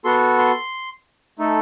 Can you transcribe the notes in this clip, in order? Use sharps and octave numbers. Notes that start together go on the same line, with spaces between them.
B3 F#4 A4 C6
C6
A3 D#4 A4